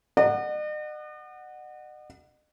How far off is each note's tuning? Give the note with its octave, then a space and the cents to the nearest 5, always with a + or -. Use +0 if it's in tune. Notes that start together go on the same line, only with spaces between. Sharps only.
D#5 -45 F#5 +0